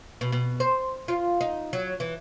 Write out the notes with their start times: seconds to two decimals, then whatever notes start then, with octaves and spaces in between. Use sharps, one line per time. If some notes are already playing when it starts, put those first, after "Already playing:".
0.21 B2
0.32 B2
0.60 C5
1.08 F4
1.41 D#4
1.73 F#3
2.00 E3